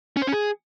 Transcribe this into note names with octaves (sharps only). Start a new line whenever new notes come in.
C#4
C5
C#4
G#4